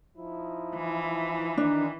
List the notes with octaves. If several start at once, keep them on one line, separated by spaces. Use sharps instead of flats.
F3 D#4 E4
E3
D#3 D4